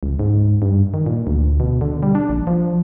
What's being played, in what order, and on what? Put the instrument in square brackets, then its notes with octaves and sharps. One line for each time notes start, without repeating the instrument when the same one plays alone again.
[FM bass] C#2
G#2
G2
D#3
A#2
D2
B2
D3
G3
D4
A#1
F3